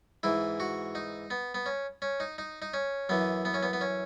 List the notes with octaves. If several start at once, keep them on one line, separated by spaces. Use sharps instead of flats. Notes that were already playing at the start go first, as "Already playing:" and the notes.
G#2 E3 E4
F#4
D#4
B3
B3
C#4
C#4
D#4
D#4
D#4
C#4
F#2 E3 B3
B3
C#4
B3
B3
C#4